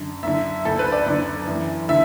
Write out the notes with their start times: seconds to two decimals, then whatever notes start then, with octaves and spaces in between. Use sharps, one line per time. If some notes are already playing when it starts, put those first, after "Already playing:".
Already playing: F#2 D3
0.23 F#2 D3 E5
0.65 D2 D3 A4
0.79 B4
0.92 D5
1.06 F#2 D3
1.47 F#2 E3
1.89 D3 E5